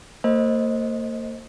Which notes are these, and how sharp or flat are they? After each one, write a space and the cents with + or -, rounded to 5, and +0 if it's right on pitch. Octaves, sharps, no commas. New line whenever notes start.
A#3 -40 C5 +15 D#5 +0